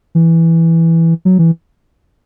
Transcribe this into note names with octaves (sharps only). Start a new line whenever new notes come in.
E3
F#3
E3